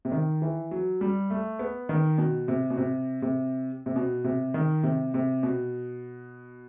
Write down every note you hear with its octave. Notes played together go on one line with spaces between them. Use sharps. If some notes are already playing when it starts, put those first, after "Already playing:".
C3
D#3
E3
F#3
G3
A3
B3
D#3
B2
C3
B2
C3
C3
C3
B2
C3
D#3
C3
C3
B2